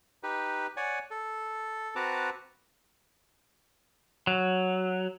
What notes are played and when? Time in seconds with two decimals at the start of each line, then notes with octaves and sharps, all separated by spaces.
0.23 D#4 G4 B4
0.77 C#5 D5 F#5 G#5
1.11 A4
1.96 C4 F#4 B4 A5 A#5 D6
4.27 F#3